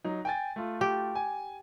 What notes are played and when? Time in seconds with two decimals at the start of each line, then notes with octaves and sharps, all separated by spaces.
0.04 F#3 D#4
0.25 G5 G#5 A6
0.56 A3 F4
0.81 G4
1.15 G#5